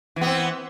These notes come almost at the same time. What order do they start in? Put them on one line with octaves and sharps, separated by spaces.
E3 B3 C4